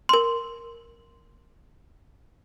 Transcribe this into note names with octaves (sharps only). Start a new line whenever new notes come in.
A#4 C6